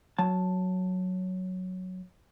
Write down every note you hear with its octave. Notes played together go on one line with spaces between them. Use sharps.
F#3 A5